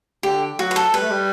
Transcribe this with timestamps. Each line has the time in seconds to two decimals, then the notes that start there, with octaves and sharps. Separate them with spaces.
0.23 D3 G4
0.58 F#3 F#4
0.71 B4
0.76 A4
0.93 G3 B4
1.02 A3
1.11 G3